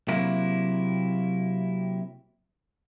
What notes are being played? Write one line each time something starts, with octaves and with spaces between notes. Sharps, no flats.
C3 F#3 A#3 E4